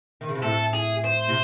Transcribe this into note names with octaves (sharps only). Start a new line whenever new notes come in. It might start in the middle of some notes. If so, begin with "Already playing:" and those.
D#3
C#3
C3
A2 A4
G#4
C5
C3